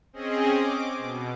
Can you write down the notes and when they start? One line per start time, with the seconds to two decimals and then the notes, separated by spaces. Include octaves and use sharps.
0.13 C4 C#4 G#4 D#5
0.56 D6
0.98 B2